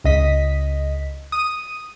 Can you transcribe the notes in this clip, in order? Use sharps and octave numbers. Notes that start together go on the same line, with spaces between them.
C#2 D#5 B6
D#6 D#7